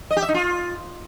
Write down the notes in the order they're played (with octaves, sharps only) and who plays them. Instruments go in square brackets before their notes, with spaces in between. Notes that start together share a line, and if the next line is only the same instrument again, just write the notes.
[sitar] D#5
G4
E5
D#4
F4